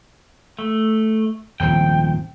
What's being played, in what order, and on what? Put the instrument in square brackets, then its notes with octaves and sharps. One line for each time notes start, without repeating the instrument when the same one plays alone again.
[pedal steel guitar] A3
[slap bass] D#1 G#1 F3 [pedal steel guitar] G5